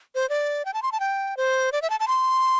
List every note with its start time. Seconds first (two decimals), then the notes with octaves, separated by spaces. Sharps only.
0.15 C5
0.30 D5
0.65 G5
0.74 A5
0.83 C6
0.92 A5
1.00 G5
1.37 C5
1.72 D5
1.82 E5
1.90 A5
2.00 A5
2.08 C6